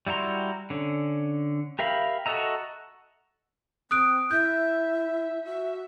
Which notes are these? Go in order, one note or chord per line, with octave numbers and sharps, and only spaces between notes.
G3 E4 F#4 A#5 C6
D3 C#4
G4 A#4 E5 F5 B5
F#4 A4 D#5 E5 A#5
C4 D#6 F#6 D7
E4 E5 G6
F#4 E5